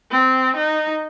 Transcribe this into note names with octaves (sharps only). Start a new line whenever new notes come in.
C4
D#4